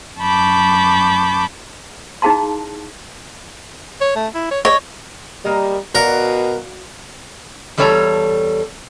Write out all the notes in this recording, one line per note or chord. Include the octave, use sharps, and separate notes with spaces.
F#2 A5 B5 C#6 D6 G6
D#4 E4 G#4 F5 A5 C6
C#5
A3
E4
C#5
C#5 D#5
G3 A#3 A#4 D#5
B2 F#4 A#4 D5 F5
E2 G3 A4 C#5 A5 A#5